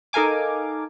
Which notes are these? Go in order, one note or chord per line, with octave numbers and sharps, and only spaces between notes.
D#4 A4 A#4 F5 G#5 D6